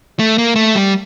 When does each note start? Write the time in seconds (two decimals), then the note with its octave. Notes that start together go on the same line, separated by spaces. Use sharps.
0.19 A3
0.38 A#3
0.56 A3
0.75 G3